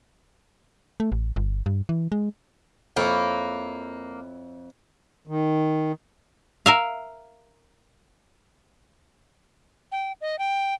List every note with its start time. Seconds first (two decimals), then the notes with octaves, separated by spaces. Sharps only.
1.00 A3
1.12 A1
1.36 G1
1.66 G2
1.89 E3
2.12 G#3
2.97 F2 A#3 E4 C#5
5.27 D#3
6.66 A#4 E5 F5
9.92 G5
10.21 D#5
10.39 G5